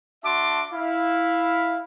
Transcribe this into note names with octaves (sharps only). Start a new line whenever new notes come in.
D4 F#4 E5 A5 C6 D6
E4 F5